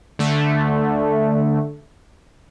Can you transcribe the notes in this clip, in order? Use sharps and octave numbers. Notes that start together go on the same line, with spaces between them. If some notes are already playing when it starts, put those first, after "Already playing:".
D3 A3